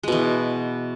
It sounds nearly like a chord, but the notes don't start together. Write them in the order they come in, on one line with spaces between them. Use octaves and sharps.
G#3 B2 E3